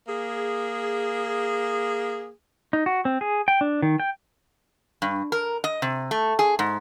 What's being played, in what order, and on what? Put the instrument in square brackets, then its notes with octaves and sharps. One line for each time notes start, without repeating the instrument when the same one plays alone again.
[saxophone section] A#3 G#4
[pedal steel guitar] D#4
F#4
C4
G#4
G5
D4
D#3
G5
[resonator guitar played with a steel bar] G2
A#4
D#5
C3
A3
G#4
G#2